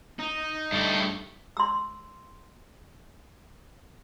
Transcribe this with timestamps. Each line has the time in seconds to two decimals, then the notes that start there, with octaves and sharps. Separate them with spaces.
0.19 D#4
0.72 G2 A3
1.57 C6 E6